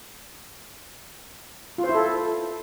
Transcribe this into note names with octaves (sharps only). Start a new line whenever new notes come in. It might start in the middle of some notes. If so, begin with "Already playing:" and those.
F4
C5
E4
A4